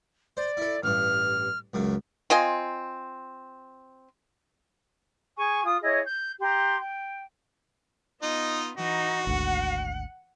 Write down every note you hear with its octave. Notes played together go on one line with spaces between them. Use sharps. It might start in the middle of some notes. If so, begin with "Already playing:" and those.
C5 D5
E4 A4
A1 G2 F6
C#2 F#2 C#3
C4 F4 D#5 G#5
G#4 G#5 C#6
F4 D#6
E4 G#4 C#5 D#5
G6
G4 A#5 C6
G5
B3 D#4 F4 D#5
E3 D#4 F#4
G#1 D2 F#5